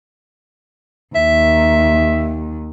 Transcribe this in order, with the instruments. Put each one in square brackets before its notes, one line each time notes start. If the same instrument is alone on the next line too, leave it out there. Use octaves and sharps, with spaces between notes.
[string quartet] D#2 [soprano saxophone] E5